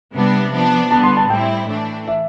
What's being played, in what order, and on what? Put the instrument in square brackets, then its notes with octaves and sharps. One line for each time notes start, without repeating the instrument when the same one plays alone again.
[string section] C3 G3 B3 D4
F3 B3 D4
[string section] D3 G3 B3 [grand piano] A5
[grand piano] C6
A5
[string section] A2 G3 C4 E4 [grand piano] G5
[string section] E3 A3 D4
[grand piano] E5